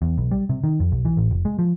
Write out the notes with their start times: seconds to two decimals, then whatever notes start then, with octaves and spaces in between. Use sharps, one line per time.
0.02 E2
0.18 B1
0.31 G3
0.49 C3
0.64 D#3
0.80 F2
0.92 B1
1.05 E3
1.17 A1
1.31 F1
1.45 G#3
1.59 F3